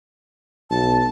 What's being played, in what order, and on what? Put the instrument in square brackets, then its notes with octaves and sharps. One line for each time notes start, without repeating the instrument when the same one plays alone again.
[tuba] B1 [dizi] A5